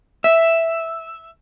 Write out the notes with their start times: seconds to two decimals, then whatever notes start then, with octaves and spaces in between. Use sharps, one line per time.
0.24 E5